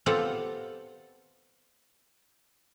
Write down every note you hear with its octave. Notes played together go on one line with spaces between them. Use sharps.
B3 C4 F4 G4 A4 F#5